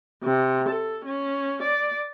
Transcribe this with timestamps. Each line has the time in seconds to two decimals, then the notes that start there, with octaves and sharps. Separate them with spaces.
0.23 C3
0.69 A4
1.04 C#4
1.63 D5